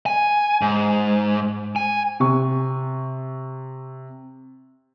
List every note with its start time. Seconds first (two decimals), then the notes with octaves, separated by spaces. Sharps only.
0.06 G#5
0.61 G#2
1.76 G#5
2.20 C3 C#6